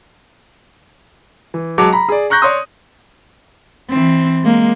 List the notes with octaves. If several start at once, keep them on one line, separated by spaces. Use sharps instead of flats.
E3
F#3 G#3 A5 D6
A#5 B5
G#4 D5
A#5 C#6 F#6 G6 A#6
C#5 D5 C6 D#6
E3 C4
G#3 A#3